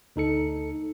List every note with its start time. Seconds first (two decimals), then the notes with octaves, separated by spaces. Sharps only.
0.16 D2 D#4 A4 C#7